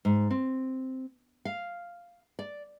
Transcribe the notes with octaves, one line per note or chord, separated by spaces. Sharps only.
G#2
C4
F5
D5